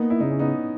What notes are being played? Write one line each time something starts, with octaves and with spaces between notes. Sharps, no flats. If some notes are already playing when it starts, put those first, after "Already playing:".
Already playing: A#3 B3 D#4
E4
C#3 D#4
C#4
B3 D#4